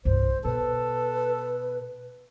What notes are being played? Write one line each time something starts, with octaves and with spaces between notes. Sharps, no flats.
C2 G2 C5
B2 A4 B4